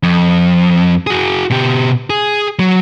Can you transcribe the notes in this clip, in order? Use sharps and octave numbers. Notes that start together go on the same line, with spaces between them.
F2
F#4 G#4
B2 G4
G#4
F#3